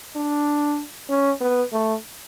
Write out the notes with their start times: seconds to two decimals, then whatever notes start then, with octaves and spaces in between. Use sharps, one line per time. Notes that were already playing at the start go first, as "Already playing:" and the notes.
0.16 D4
1.09 C#4
1.41 B3
1.72 A3